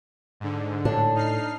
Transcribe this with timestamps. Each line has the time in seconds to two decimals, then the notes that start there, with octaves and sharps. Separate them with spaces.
0.40 G#2 D3
0.85 A2 D4
1.15 D#4 F6 C7